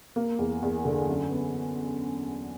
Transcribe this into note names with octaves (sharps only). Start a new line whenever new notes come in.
A#3
E2
E2
D3
F#2
B3